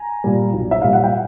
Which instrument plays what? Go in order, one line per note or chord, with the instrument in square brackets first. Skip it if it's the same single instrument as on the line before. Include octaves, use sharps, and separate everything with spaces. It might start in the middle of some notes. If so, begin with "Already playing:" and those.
Already playing: [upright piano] G#5 A#5
A#2 G3
B1
E5
A#2 G3 F5
F#5
G5